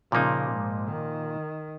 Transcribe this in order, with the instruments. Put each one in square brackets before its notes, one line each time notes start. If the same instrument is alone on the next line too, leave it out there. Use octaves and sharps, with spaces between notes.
[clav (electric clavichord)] A#2 F3 A#3 D#4 [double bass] C#3
[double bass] G#2
D#3